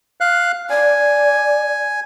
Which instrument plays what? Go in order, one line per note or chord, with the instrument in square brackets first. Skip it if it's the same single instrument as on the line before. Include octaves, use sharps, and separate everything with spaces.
[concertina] F5 F#6
[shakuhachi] D5 [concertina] G#5